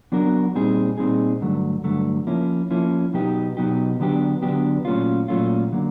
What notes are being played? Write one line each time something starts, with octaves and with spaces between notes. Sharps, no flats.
F#3 B3 D4 F#4 A#4
A#2 G3 C4 D#4 G#4
A#2 G3 C4 D#4 G#4
G2 D3 F#3 A3
G2 D3 F#3 A3
F3 A#3 C#4 E4
F3 A#3 C#4 E4
B2 F#3 B3 D#4 G4
B2 F#3 B3 D#4 G4
D3 F#3 B3 D4 G4
D3 F#3 B3 D4 G4
A#2 F#3 A3 C#4 F4
A#2 F#3 A3 C#4 F4
D3 F#3 A#3